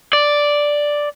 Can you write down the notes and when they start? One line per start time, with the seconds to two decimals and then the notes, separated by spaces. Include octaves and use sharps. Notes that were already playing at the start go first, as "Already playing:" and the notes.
0.13 D5